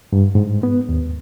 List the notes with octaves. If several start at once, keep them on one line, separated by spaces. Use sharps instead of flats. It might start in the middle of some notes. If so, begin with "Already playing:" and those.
G2
G#2
B3
D#2